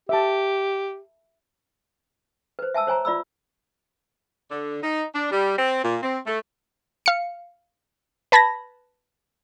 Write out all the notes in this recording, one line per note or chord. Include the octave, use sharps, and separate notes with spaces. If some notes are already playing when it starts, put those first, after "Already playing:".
G4 E5 A5
B4 C5
E5 G#5 A5 E6
C5 C#5 G#5 A#5
F4 D5 B5 E6
D3
D#4
D4
G3
C4
A#2
C4
A3
F5 C#7
B4 A5 B5 G#6 A#6